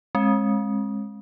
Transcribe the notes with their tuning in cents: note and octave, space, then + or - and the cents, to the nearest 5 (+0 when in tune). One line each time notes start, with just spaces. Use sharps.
G#3 +0 C4 +40